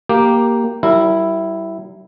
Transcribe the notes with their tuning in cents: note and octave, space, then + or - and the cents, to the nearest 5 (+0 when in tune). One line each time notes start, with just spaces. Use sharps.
A#3 +0 G4 +0
G3 -35 E4 +0 A#4 -25